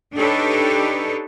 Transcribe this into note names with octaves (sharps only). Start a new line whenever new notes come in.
D4 D#4 G4 A4 B4 C#5